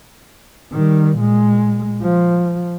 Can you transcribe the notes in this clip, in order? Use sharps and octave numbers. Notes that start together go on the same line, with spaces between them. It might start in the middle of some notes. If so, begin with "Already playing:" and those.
D#3 G3
A#2 G#3
F3